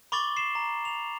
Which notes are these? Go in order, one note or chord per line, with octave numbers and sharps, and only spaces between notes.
B5 C#6 D6 A6 F#7 G7
C7 E7
A#5
F7